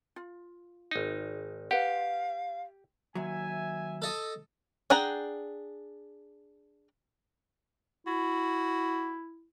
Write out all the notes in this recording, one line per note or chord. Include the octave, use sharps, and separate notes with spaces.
F4
G#1 D#4
G4 B4 F5 F#5
D#2 F#3 E5 G#5
A4 D#5
D4 G#4 F#5 G5 A#5
E4 F#4